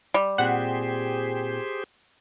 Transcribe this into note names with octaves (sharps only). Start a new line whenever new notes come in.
G3
A#2 C4 G4 G#4 C5 F#5